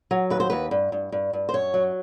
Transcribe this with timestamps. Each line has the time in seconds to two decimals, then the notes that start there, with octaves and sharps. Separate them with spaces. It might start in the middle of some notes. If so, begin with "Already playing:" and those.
0.11 F#3
0.30 D#2 B4
0.40 C5
0.50 D#2 B4
0.71 G2
0.92 G2
1.12 G2
1.33 G2
1.49 C5
1.53 F#2 C#5
1.74 F#3